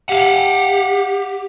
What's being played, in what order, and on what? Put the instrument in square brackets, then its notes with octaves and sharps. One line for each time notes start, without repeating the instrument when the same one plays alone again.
[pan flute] G4 [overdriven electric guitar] F5 F#5